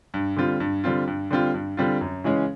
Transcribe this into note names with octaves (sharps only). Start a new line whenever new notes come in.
G2
D3 G3 C4 F4
G2
D3 G3 C4 F4
G2
D3 G3 C4 F4
G2
D3 G3 C4 F4
F#2
C#3 E3 G#3 C#4